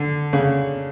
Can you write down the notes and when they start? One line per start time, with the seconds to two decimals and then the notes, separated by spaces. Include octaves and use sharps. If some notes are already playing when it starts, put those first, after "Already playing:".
Already playing: D3
0.33 C#3